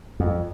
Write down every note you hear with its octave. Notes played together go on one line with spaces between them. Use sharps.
F2